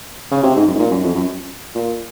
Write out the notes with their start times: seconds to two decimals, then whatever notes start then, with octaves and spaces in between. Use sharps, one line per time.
0.31 C#3
0.43 C3
0.56 G#2
0.67 F#2
0.75 G#2
0.79 A#2
0.91 F#2
1.04 F2
1.15 F#2
1.75 A#2